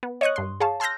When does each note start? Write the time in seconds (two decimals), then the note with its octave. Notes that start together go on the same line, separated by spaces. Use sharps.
0.03 B3
0.21 C#5 D#5 C#6 D#6 F#6
0.36 G2 C6
0.60 G#4 C#5 F5 A5
0.80 A5 C6 E6 F6 G6 A#6